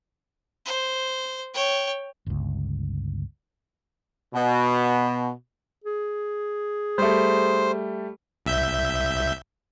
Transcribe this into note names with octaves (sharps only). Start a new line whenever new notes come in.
C5
C#5 G5
G1 C#2
B2
G#4
G3 A3 C5
C2 E5 G6